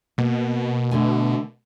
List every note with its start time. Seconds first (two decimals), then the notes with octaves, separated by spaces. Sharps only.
0.18 B2 A#3
0.91 D3 A3 G#5